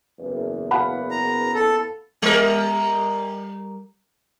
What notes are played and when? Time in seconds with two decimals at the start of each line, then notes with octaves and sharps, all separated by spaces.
0.19 F#1 E2
0.71 F5 F#5 B5
1.11 A#5
1.54 A4
2.22 G3 A#4